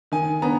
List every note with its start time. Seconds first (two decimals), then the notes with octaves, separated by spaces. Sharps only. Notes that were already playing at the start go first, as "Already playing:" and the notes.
0.12 D#3 G#5
0.42 B3 A#5